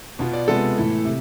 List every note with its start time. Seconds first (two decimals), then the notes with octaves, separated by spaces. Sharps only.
0.19 B2 B3 F4
0.33 D5
0.48 C3 G#3 B3 F4 A4
0.77 A2 E3 A3 E4
1.05 C3